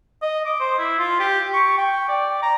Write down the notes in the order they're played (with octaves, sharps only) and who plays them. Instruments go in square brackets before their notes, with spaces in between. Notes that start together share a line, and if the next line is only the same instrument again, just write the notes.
[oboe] D#5
D6
C5
E4
F4
G4
C#6
G5
D5
A#5